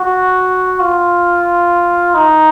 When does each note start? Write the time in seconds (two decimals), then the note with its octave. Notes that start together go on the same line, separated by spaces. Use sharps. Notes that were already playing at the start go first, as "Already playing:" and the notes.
Already playing: F#4
0.80 F4
2.14 D#4